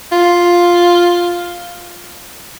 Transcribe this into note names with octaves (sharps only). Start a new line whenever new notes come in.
F4